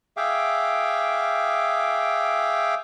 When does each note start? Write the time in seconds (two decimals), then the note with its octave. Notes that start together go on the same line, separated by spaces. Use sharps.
0.17 G#4 E5 F5 G5 D6